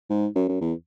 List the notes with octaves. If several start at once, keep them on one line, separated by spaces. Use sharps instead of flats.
G#2
F#2
F#2
E2